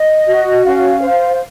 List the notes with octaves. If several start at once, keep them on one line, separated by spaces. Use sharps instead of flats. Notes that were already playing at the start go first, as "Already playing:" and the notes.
Already playing: D#5
F#4
C#4 F5
C5